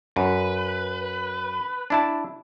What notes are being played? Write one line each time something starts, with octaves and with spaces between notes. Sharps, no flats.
F#2 B4
D4 E4 A5